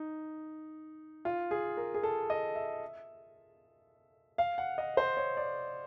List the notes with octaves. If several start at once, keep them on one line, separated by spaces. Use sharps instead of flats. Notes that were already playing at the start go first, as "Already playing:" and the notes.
Already playing: D#4
F4
G#4
A#4
G#4
A4
D#5
E5
F5
F#5
D#5
C5
C#5
D5